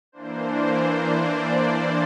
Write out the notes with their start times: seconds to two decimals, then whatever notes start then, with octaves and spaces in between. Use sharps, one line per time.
0.12 E3 A#3 D4 C5
1.03 D5